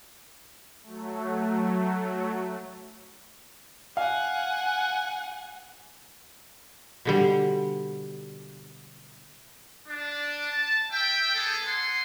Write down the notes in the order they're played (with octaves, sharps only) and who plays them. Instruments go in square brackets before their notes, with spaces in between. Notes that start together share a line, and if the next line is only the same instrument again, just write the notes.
[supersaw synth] F#3 A3
[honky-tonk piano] F5 [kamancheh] F#5 G#5
[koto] B2 D3 G3
[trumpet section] D4
A5
E5 G5
B3 G#4 A4
F#5 G#5 C6